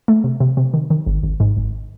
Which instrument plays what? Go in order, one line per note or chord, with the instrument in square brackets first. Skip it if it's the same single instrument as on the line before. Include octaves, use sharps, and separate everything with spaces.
[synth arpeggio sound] A3
C3
C3
C3
D#3
D#3
G#1
G#1
G#2
G#1